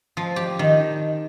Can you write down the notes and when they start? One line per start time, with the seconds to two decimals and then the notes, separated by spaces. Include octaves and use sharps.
0.17 F3
0.36 G4
0.59 D#3